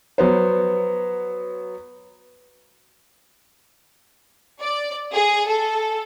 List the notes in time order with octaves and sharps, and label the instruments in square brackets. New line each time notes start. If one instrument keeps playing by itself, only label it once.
[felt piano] F#3 B3 C5
[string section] D5
G#4
A4